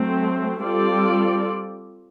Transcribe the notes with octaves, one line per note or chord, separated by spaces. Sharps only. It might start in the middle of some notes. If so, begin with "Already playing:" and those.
Already playing: F#3 A3 C4
G3 C4 F4 A4 D5